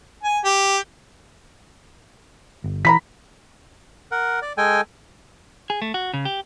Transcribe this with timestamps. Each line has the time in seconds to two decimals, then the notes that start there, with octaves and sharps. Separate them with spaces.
0.23 G#5
0.45 G4
2.64 G1
2.85 E3 A#5 B5 B6
4.11 A#4 F#5
4.42 D5
4.58 G#3 A4 G5 G#5
5.70 G#4
5.82 A3
5.94 F#4
6.13 C#3
6.25 G4